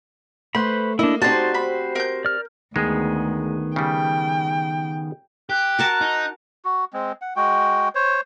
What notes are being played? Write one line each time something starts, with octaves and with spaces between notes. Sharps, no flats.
A3 B4 C5 B5 C6
A#3 D4 E4 D#5
C4 D#4 F#4 G4 C5 D5 A5
B5
A#4 G6
D5 F6
D2 D#3 G#3 B3 G#4
C#3 G3 G5
G4 F#6
F#4 A#4 A5
D#4
F#4
G#3 C4
F#5
G#3 F#4 G5
C5 C#5